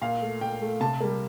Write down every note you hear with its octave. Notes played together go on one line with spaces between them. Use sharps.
A#2 F5
A3
A#2 G5
A3
C3 A5
G3 A#3